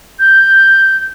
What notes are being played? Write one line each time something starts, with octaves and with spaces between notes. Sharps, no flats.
G6